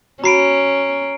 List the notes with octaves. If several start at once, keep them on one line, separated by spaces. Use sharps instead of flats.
C#4 F#4 A#5 B5 C7 D7